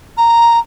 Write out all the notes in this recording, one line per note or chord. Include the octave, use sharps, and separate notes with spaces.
A#5